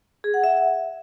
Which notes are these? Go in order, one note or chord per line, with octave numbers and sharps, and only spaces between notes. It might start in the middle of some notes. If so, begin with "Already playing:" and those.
G#4
F#5
E5